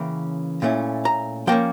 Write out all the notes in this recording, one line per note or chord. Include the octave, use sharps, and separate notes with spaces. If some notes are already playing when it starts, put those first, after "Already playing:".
Already playing: C#3 E3 A#3 C#4 G5
A#2 A3 C#4 E4
A#5
F3 A#3 C#4 G5